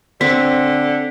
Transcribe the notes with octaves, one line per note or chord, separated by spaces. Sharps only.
D3 C4 B6